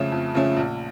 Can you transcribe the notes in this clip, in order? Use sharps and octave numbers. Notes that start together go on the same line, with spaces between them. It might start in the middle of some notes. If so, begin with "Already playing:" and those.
Already playing: F2 C#3 F3 A3 C#4
F2
C#3 F3 A3 C#4
A#1